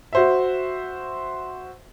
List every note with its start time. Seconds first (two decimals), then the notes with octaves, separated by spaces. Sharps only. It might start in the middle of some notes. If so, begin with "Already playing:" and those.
0.13 F#4 C5 E5